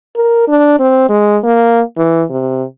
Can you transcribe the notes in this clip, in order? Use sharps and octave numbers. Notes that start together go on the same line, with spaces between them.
A#4
D4
C4
G#3
A#3
E3
C3